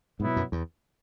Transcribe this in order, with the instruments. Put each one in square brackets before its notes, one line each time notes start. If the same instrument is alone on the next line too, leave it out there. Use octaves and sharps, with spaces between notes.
[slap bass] G#2 [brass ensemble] B2 F#3 B3 E4
[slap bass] F#2
E2